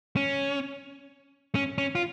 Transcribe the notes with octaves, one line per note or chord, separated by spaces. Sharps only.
C#4
C#4
C#4
F4